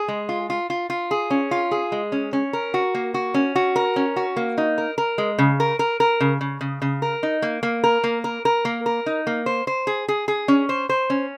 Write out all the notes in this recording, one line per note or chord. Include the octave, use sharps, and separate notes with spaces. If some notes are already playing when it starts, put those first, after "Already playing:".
Already playing: G#4
G#3
F4
F4
F4
F4
G#4
C#4
F4
G#4
G#3
C#4
C#4
A#4
F#4
A#3
F#4
C#4
F#4
A#4
C#4
F#4
A#3
D#4
A#4
A#4
G#3
C#3
A#4
A#4
A#4
C#3
C#3
C#3
C#3
A#4
D#4
A#3
A#3
A#4
A#3
A#4
A#4
A#3
A#4
D#4
A#3
C5
C5
G#4
G#4
G#4
C#4
C5
C5
C#4